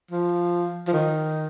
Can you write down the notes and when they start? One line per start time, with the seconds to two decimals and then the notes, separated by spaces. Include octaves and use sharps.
0.11 F3
0.87 F3
0.93 D#3